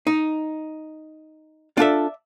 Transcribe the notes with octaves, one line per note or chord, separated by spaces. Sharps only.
D#4
D4 F4 A4 D5 E5